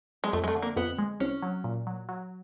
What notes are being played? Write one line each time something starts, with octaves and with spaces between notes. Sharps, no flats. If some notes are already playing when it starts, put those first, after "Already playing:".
G#3
F2 A3
G#3
A3
D3
A#3
F2 B3
G#3
C2 C#4
F#3
A#2
F#3
F#3